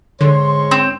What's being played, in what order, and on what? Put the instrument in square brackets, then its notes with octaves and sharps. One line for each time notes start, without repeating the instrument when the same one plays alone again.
[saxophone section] G#2 C#5 [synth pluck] D3 [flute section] C6
[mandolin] C4